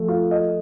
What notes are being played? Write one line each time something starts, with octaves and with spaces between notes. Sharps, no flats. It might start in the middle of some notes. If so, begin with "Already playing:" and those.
Already playing: F3 A3
F4
D#5